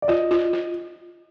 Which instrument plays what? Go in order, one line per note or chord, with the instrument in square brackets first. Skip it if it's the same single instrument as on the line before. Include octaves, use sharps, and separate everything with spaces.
[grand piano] D5
[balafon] F4 [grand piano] D#5
[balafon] F4
F4